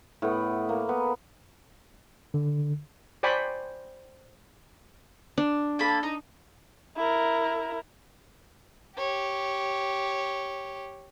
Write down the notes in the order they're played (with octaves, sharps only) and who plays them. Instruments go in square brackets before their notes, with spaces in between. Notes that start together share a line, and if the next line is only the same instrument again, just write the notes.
[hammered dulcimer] A2 B3
A#3
B3
[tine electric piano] D3
[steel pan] C5 D5 G5 G#5 B5 C#6
[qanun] D4
[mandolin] A#3 A4 B5
D#4
[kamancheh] E4 A#4
[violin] G4 C#5